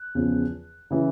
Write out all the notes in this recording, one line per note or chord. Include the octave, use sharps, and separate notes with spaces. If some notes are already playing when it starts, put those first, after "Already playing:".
Already playing: F#6
E2 C#3 F3
C#3 E3